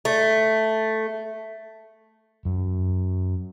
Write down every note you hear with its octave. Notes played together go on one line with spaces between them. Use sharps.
A3
F#2